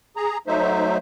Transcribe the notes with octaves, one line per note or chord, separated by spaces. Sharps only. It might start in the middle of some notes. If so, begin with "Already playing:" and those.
G#4 A#5
F#3 A3 D#4 C5 E5